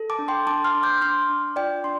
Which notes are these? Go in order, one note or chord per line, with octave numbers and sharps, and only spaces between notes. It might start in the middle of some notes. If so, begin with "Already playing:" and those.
Already playing: A4
A5 D6
D4
G5 C6
D4 A5 D6
C6 F6
D4
D6 G6
D4 C6 F6
D4
F4 D5 G5
D4 C6